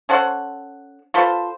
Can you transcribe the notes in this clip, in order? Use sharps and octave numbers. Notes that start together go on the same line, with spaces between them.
C#4 A4 C5 F#5
F4 A4 B4 C5